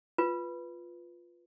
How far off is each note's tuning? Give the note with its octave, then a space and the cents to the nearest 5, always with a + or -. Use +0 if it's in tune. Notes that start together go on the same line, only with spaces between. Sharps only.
F4 +0 B4 -5